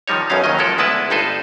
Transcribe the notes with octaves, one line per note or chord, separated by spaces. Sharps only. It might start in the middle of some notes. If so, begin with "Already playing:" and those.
D#3 F3 G3 D#4 C#5
B1 F#2 B2 F#3 C#4 F5
D#2 D#3 F#3 D#5
F3 G#3 C#4 A4 A#4
D2 G#3 B3 E4 B4 A5
G1 G2 D#4 A4 B4 C5